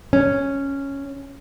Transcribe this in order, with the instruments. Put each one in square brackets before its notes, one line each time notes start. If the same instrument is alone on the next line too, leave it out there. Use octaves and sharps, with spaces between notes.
[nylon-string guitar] C#4